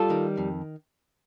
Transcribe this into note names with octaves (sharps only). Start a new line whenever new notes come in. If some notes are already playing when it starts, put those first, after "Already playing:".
Already playing: G3 F4 A4
D#3
F2